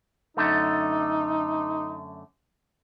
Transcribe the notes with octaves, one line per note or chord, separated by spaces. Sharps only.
F#2 D3 A3 D#4